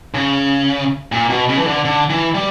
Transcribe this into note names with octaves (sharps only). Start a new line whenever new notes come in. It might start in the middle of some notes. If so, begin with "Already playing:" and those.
C#3
A#2
B2
C#3
E3
D3
D3
E3
G3